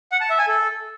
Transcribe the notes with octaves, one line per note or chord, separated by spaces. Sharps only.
F#5
A5
E5
G#5
A4